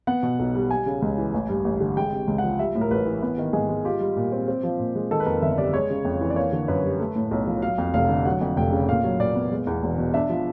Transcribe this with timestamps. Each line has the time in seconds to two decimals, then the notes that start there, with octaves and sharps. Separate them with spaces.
0.07 B3 F#5
0.23 B2
0.39 B1
0.55 G3
0.71 G3 G#5
0.86 C#3
1.02 C#2
1.18 E3
1.34 A1
1.49 G2
1.65 A1
1.80 D3
1.97 G#3 G5
2.12 C3
2.28 C#2
2.38 F#5
2.44 F3
2.59 G3 E5
2.75 A2
2.81 A#4
2.91 A1 B4
3.06 E3
3.22 B3 B4
3.38 D#3
3.53 G#2 G#4
3.69 G#3
3.85 F4 G4
4.01 G3
4.16 A#2
4.32 C4
4.48 C4
4.63 F3
4.79 A#2
4.95 G#3
5.11 D#3 A4
5.20 B4
5.26 F2 A#4
5.42 G1 E5
5.58 C3 D5
5.73 G#3 C#5
5.90 C#3
6.05 F2
6.21 E3
6.30 D5
6.36 A#3 C#5
6.52 D3
6.68 F#2 B4
6.84 G3
7.00 A3
7.16 A2
7.31 B1
7.47 F3
7.62 F#3 F5
7.78 F2
7.94 F1 F5
8.09 D3
8.25 F#3 F#5
8.41 F2
8.57 F1 G5
8.72 C#3
8.89 A#2 F5
9.04 F#3
9.20 A#2 D5
9.36 B3
9.52 G#3
9.67 E2
9.82 E1
9.98 B2
10.14 D4 E5
10.29 F3